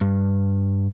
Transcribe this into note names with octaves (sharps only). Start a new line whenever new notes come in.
G2